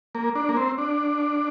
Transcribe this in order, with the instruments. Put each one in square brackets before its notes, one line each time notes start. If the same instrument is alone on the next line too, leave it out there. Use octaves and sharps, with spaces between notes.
[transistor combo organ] A#3
D4
A#3
C4
D4